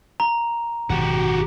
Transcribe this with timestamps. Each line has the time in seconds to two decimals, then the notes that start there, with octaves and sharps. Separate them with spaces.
0.20 A#5
0.90 G#1 F#2 B2 F#4 G4